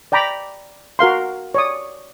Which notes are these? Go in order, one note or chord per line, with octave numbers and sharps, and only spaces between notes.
D5 G5 A#5 B5 D6
F#4 A#4 F5 C6
C#5 D5 D#6